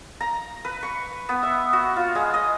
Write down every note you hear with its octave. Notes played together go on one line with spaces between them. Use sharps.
A#5
B4
C#6
B3
E5
F#4
F4
G#3
D#5